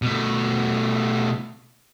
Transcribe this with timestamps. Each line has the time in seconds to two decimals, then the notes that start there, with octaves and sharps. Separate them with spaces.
0.02 B2 A3